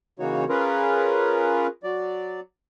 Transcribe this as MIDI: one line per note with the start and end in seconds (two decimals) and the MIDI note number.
0.19 0.44 49
0.19 0.44 52
0.19 0.44 58
0.19 0.44 63
0.19 0.44 66
0.19 0.44 73
0.49 1.67 61
0.49 1.67 65
0.49 1.67 68
0.49 1.67 70
0.49 1.67 71
1.84 2.40 54
1.84 2.40 74